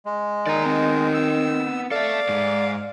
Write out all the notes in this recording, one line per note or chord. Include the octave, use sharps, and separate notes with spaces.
G#3
D#3 D5 A#5
B3 C4
E6
A4 D5 E5 F5
G#2 G#3